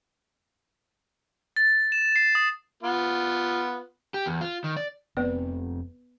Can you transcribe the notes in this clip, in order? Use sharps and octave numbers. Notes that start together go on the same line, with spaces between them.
A6
E7
C7
D#6
B3 F4
G4
E2
F4
D#3
D5
F1 B3 C4 B4 D5